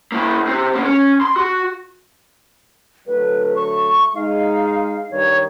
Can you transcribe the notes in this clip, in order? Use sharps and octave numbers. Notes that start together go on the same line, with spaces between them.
A#3 E4
C3 C4
C#3 A#3
C#4
C6
F#4
D3 F#3 A3 B4
C#6
G#3 D#4 F5
G2 D#3 C#5